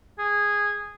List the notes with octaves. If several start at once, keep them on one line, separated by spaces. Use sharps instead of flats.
G#4